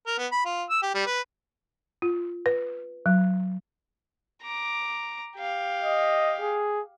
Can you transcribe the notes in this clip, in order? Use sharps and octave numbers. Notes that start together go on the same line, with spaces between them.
A#4
B3
B5
F4
E6
G4
G3
B4
F4
B4
F#3
A#5 D6
G4 F5
D#5
G#4